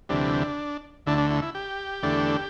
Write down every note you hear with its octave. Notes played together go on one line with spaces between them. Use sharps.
D2 C3 E3 G3 D4
D2 D3 A3 D4 E4
D4
E4
E4
G4
E2 D3 A3 D4